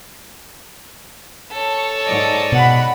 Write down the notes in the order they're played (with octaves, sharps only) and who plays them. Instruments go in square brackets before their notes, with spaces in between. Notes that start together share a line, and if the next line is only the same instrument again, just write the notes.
[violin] A4 C#5
[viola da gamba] G#2 D5 D#5
[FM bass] B2 [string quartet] F#5 B5